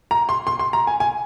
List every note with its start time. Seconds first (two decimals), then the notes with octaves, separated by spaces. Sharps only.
0.11 A#5
0.29 C6
0.47 C6
0.59 C6
0.73 A#5
0.87 G#5
1.00 G#5